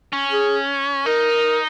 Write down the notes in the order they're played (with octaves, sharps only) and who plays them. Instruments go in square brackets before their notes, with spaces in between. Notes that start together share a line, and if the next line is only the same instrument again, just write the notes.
[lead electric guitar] C#4
[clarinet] G#4
[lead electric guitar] D#4 [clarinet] A#4